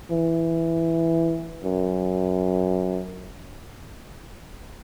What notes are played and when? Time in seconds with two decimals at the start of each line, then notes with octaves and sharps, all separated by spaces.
0.11 E3
1.64 F#2